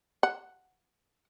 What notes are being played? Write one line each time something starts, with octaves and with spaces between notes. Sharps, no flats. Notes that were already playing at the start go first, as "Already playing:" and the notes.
F#5